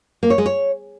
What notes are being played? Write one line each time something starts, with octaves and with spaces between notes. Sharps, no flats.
A#3
C#5
G#3
C#5